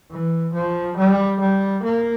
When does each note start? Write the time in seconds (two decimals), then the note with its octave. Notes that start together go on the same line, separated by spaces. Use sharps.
0.11 E3
0.54 F3
0.97 G3
1.40 G3
1.83 A#3